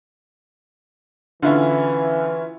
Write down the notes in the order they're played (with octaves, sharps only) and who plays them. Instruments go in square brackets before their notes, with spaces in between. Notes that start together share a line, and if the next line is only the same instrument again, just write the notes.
[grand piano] D3 [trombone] E3 [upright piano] C#4 E4 F4